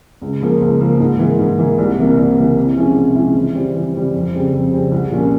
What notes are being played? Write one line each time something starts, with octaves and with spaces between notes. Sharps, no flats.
C#2
C#3 F3 A#3
C#2
C#3 F3 A#3
G#2
E3 A#3
G#2
E3 A#3
C2
C3 E3 A#3
C2
C3 E3 A#3
C3
F3 G#3 C#4 E4
C3
F3 G#3 C#4 E4
E3
G3 C4
E3
G3 C4
F2
C#3 G3 C4
F2
C#3 G3 C4
C2
A#2 F3 A#3 C#4